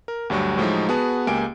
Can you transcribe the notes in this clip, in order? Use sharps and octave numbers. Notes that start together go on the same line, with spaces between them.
A#4
D2 G2 F#3 G3 C#6
A2 F3 F#3 G#3 D#4
B3 F#4 G#4 B4 F#5 A5
C#2 A#3 G4 G#5 D7